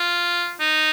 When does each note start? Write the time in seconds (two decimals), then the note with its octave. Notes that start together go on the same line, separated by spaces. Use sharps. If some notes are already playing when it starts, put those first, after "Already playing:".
Already playing: F4
0.60 D#4